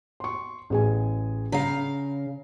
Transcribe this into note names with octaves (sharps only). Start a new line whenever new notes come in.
C6 C#6
A1 G#4 G#5
C#3 F5 A#5